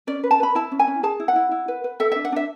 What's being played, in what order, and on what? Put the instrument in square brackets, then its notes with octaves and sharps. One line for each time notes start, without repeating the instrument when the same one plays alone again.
[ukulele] C#4 D5
B4
A5
B4 B5
E4 A5
C#4
G#5
C#4
G#4 A5
E4
F#5
E4
E4
B4
B4
A4 E5
D4 E5
F#5
D4 E5